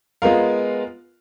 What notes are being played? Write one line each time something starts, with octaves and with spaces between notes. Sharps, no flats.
G#3 B3 F4 A#4 F5